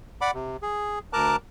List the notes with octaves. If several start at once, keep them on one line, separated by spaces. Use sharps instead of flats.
D5 F#5 B5 D6
C3
G#4
D2 A#4 A5 A#5 D6 F#6